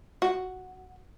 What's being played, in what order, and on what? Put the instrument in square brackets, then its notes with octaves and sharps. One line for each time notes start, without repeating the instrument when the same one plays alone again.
[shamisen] F#4